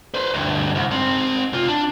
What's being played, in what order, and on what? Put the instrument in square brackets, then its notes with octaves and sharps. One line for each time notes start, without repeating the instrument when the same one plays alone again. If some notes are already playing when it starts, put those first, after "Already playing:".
[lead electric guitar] B4 C5
D2 G2
C2
G#2 C4
C3 F4
D4